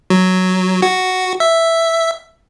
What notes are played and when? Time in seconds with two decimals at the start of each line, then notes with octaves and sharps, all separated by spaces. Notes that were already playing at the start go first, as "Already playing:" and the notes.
0.10 F#3
0.82 F#4
1.40 E5